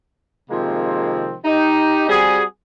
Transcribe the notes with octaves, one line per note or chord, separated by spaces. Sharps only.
C3 D#3 F3 G#3 A#3 C4
D#4 G4
G3 C4 F#4 G#4